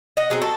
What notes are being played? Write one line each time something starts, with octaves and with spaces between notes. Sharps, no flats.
D#5 F#5
F#3 C4 G#4
F#4 A4